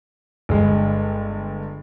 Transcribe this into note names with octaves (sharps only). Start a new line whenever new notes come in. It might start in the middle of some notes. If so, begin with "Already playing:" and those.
G1 G#3